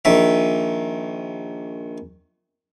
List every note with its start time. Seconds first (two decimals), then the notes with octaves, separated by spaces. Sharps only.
0.05 A#1 D#3 E5